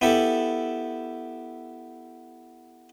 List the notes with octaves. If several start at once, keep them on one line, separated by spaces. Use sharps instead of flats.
B3 E4 G4 A4